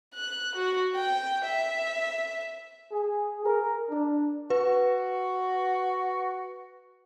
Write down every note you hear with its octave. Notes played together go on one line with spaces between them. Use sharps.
F#6
F#4
G5
E5
G#4
A#4
D4
F#4 B4